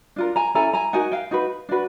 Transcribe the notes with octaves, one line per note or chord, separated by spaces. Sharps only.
D4 F4 A#4
G#5 A#5
C#4 E4 A4 G#5 A#5
G#5 A#5
D#4 F#4 A#4 F#5 G#5
F5 G5
D#4 F#4 B4
D4 F#4 B4